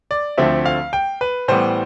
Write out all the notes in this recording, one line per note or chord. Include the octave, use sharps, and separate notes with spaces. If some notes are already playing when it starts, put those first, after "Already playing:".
D5
D2 D3 F3 A3 C4 E5
F5
G5
B4
A2 E3 G3 B3 C5